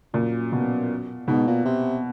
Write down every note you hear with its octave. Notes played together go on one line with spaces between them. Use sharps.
F#2 A#2
B2
G#2 B2
A#2
C3